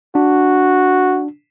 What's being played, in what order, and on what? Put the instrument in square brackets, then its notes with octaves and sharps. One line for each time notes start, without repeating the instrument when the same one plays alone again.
[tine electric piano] D4 [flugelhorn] F#4